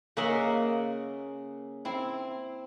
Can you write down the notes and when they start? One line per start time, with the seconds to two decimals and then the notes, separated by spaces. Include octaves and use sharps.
0.17 C#3 A#3 C#4 D#5 E5 F#5
1.85 C4 E4